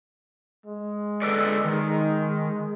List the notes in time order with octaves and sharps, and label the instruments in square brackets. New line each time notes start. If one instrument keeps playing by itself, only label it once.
[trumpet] G#3
[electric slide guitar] A4 B4 D5
D#3